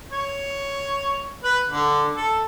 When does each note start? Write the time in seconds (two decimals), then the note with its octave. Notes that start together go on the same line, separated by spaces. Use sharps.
0.12 C#5
1.44 B4
1.68 D3
2.16 A4